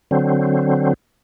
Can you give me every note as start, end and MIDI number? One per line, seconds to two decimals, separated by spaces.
0.11 0.94 50
0.11 0.94 54
0.11 0.94 60